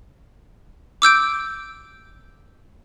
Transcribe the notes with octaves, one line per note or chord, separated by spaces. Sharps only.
D6 E6 G6 D7